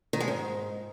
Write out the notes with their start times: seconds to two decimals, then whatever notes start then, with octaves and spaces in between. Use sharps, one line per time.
0.13 D#3
0.20 G#3
0.28 G#2